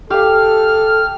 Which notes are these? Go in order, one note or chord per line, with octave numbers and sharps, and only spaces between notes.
G4 A4 F5 F6